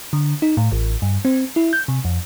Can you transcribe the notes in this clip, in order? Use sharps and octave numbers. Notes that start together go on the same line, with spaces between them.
D3
D#4
A2
A1
G2
C4
E4
G6
C3
F2